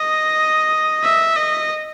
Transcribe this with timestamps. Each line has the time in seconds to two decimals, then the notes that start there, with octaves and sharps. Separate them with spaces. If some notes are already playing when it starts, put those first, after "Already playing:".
Already playing: D#5
1.04 E5
1.36 D#5